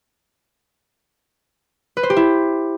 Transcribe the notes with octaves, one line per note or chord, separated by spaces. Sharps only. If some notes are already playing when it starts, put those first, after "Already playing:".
B4
C5
G4
E4